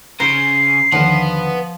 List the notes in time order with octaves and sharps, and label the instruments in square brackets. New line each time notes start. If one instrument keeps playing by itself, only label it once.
[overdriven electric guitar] C#3 [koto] C5 [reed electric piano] A#5 [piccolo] C7
[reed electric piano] D#2 D3 [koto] F3 [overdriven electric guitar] B4 F#5